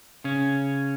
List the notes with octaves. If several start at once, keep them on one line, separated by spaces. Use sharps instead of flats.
C#3 C#4